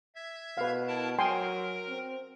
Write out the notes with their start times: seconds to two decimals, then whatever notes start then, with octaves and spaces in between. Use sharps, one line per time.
0.15 E5 G#6
0.57 B2 B4 F5
0.87 E4 A#4 A5
1.19 F#3 A#4 G5 G#5 C6
1.88 C4